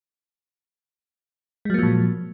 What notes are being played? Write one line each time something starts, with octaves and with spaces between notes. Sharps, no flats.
A#2 F3 F#3 G#3 A#3